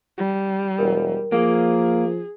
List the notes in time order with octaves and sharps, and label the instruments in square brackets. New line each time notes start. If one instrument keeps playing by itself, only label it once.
[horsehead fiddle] G3
[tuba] E1 [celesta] A#4
[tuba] F3 [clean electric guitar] A#3 [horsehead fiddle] G#4